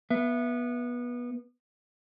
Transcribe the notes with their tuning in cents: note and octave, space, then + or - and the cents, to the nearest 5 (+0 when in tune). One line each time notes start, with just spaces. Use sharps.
B3 -20 E5 +20